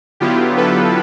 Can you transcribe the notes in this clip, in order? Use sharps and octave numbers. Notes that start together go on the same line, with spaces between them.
D3 F#3 B3 E4 F4 G4
A4 B4